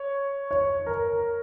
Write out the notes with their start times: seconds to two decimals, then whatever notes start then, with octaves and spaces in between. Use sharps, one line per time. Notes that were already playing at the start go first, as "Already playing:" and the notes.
Already playing: C#5
0.51 C#5
0.86 A#4